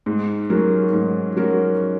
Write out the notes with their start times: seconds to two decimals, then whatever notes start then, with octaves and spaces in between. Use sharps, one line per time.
0.06 G#2
0.50 F#3 C#4 F#4 A#4
0.93 G#2
1.36 F#3 C#4 F#4 A#4